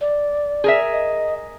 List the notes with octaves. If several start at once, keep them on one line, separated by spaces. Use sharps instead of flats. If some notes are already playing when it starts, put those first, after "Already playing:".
D5
G#4 A#4 E5
D#5